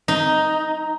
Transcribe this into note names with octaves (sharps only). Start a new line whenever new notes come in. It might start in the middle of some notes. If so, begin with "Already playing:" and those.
D#4